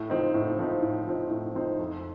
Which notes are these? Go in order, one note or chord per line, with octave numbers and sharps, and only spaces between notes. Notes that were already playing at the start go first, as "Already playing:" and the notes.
Already playing: A2
F3 C4 D#4
A2
F3 C4 D#4
A2
F3 C4 D#4
A2
F3 C4 D#4
F2